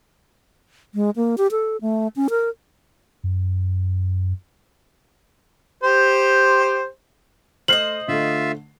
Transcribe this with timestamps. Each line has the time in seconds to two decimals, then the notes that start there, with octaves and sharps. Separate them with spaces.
0.95 G#3
1.16 A#3
1.38 G4
1.51 A4
1.81 A3
2.16 C#4
2.30 A#4
3.24 F#2
5.83 G4 C5
7.68 A3 C5 C#5 D#5 F6 C7 F#7
8.08 D3 A3 F4 E5